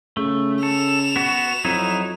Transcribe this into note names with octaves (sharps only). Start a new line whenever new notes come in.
C#3 A3
A4 E7 F7
B3 F#4
F2 F#3 D#4 E4